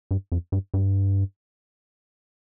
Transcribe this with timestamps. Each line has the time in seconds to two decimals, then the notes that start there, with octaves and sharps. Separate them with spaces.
0.11 G2
0.32 F2
0.52 G2
0.74 G2